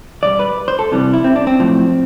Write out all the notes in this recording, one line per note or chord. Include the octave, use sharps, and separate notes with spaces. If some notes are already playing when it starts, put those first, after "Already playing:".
E2 B2 G3 D5
B4
C5
A4
C2 C3 E3 G3
E4
C4
D4
C4
B1 A2 F3